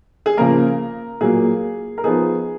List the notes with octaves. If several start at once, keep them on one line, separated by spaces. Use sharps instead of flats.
G#4
C#3 F3 A#3 A#4
A#2 F#3 A#3 G#4
A#4
F3 B3 D#4 G#4